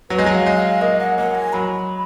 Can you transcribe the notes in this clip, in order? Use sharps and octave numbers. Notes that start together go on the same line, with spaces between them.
F#3 B4
G#3
F#3
F5
G#3
F5
A#3 D#5
F#5
A#3 F#5
G#5
F#3 B5